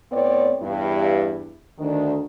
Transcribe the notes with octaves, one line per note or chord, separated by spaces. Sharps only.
A2 B3 C4 E4 C#5 D5
E2 G2 E4
D2 D#3 D4